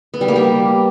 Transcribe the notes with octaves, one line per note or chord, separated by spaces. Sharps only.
B3
G3
A#3
G4